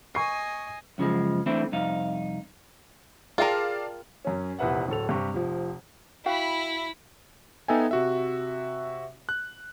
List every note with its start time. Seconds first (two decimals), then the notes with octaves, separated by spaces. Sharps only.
0.15 D#5 G#5 C#6 C7
0.98 F#2 C#3 F3 G#3
1.46 E3 A3 C4 D4 E4
1.72 C2 F2 D#4 F5
3.38 F4 G#4 A#4 D5 F5 G5 A5
4.25 F#2 C#4
4.59 F1 E2 A#2 B4 E5 F#5
4.88 D1 A2 A4 F7
5.09 G2 C3 G4 C#6
5.34 F1 F3
6.26 E4 F#4 F5 G5 B5
7.68 B3 D#4 A4 E5 G5 G#5
7.91 C3 F#4 E5
9.29 F#6